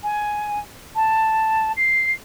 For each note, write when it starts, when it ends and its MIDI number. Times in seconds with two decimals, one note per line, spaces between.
0.03 0.59 80
0.95 1.72 81
1.76 2.12 96